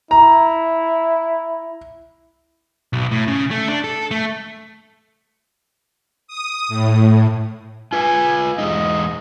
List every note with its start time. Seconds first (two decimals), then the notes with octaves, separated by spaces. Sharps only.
0.11 E4 A#5
2.93 B1
3.11 A2
3.28 C#3
3.51 A3
3.68 D4
3.84 A4
4.11 A3
6.27 D#6
6.68 A2
7.93 F4 B4 G#5
8.58 E2 G#3 D#4 D#5